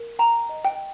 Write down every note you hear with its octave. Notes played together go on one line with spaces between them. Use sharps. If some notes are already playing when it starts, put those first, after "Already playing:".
Already playing: A#4
G5 A#5
D#5
G5